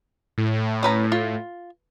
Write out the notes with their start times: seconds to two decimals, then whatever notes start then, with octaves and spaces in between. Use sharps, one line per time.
0.38 A2
0.83 C#4 B4 A#5
1.12 F4